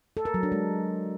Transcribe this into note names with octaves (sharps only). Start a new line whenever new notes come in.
A4
A#4
F#3
D4
G#3